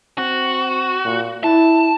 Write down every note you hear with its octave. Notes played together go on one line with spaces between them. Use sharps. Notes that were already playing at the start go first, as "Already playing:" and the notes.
C4 F#4
A#2
E4 A5